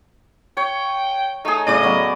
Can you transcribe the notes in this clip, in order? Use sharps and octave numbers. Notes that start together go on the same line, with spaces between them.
C#5 G5
A3 D#4 G#4
A2 C#3 D5 D#5
F#3 B3